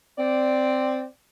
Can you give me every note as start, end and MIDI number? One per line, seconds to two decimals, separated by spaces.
0.18 1.05 60
0.18 1.05 74